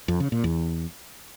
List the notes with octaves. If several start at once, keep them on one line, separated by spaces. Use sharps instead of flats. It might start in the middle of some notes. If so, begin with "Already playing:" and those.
F2
C#3
A#2
E2